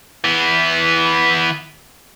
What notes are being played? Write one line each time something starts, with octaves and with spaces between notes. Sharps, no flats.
E3 B3